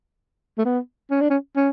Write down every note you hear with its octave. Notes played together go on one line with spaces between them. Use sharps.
A3
B3
C#4
D4
C#4
C#4